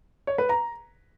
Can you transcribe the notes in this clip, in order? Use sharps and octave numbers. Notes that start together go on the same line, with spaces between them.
C#5
B4
A#5